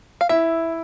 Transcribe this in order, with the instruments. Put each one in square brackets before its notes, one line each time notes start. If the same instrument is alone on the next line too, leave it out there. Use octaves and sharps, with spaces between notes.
[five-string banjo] F5
[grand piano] E4 [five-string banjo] E5